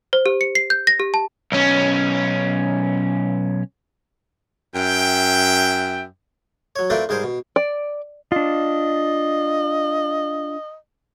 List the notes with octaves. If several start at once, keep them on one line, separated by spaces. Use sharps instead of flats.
C5
G4
C#7
C7
G6
A#6
G4
A5
B1 C#4
F#2 E5 G5
F#3 C#5
A3 C4 F4 A#4 B4 D5
G#2 G3 G#4 A#4 C5
B2
D5
D4 F4 D#5